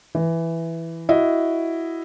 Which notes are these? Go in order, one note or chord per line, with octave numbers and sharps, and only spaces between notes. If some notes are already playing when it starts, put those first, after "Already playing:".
E3
E4 F#4 D#5